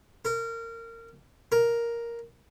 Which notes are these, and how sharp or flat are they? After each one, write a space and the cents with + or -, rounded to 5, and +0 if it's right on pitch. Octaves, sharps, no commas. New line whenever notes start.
A#4 -25
A#4 +5